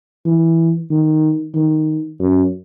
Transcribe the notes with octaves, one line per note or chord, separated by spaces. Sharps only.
E3
D#3
D#3
F#2